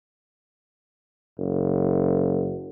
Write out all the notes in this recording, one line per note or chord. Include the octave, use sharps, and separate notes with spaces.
F#1